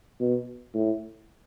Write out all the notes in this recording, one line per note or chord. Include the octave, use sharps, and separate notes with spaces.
B2
A2